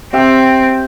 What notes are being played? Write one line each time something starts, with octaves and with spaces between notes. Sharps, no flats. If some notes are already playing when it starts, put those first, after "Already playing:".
C4 G4 E5 G5